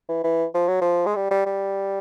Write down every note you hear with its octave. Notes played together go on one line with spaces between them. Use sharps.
E3
E3
F3
F#3
F3
G#3
G3
G3
G3